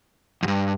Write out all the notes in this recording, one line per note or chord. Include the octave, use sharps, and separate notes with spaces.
F2
G2